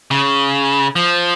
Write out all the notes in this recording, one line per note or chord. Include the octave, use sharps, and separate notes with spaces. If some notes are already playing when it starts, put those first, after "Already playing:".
C#3
F3